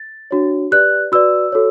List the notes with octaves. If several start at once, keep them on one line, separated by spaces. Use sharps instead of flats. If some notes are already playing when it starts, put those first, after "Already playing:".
Already playing: A6
D4 F#4 C#5
G4 B4 D5 F#6
F#4 B4 D5 E6
F#4 A4 C#5